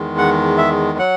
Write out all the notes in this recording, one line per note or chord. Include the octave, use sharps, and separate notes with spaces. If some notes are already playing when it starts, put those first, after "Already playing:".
Already playing: E2 D#3 G#3
F#5
E5
F#3 F#5